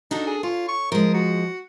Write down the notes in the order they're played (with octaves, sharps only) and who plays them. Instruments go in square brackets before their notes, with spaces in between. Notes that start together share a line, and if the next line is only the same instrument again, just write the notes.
[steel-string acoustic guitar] D4 F#4 A4 [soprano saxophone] D#4
[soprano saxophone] G#4
[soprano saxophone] F4 [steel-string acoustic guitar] C#5
[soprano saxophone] C#6
[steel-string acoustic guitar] F3 G#3 [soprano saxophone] A#4
[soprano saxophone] F#4